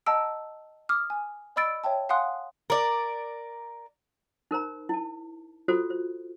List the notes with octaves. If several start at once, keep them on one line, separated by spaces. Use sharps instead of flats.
D#5 F#5 A5 A#5 E6 D7
D6 D#6 F6
G#5
D5 D#5 B5 E6 A6 D7
C#5 E5 G5 A5
F5 F#5 G#5 C6 D#6 F#6
A#4 D5
D#4 A#4 C5 A#5
E4 A5
F4 F#4 A4 C5
C5